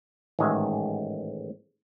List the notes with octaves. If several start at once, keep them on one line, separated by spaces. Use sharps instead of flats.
A1 G#2 D#3 G#3 F#4 E5